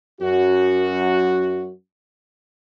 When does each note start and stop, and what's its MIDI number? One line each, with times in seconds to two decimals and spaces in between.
0.21 1.71 42
0.21 1.71 66